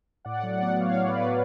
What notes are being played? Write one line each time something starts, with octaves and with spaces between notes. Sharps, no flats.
A2 D5 F#5
F#3
D5 F#5
B3
A2 C#5 F5
A2
B4 D5
F#3